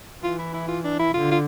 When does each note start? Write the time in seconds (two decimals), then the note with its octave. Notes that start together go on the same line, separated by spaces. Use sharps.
0.23 E3 F4
0.39 E4
0.54 E4
0.68 F4
0.84 D4
0.99 E4
1.14 D3 F4
1.31 F4